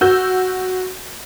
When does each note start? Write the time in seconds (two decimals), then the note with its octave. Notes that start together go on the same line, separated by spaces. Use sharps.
0.01 F#4 E6 G6